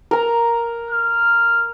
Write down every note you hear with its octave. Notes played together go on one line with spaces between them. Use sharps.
A#4 A#5
F6